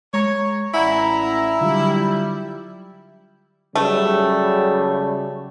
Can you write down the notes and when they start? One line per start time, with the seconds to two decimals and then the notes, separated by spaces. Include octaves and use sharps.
0.14 G#3 C#5 A#5 C#6
0.74 A1 E4 D5 F#5 G#5 A#5
1.61 D3 F#3 G3 F4
3.75 C#3 F#3 G3 A3